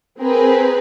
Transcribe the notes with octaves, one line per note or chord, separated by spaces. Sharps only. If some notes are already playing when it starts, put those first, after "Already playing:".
C4 G#4 A#4 B4